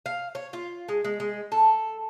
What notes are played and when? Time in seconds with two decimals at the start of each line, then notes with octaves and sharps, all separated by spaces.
0.06 F5
0.35 C#5
0.53 F4
0.89 G#3
1.05 G#3
1.20 G#3
1.52 A4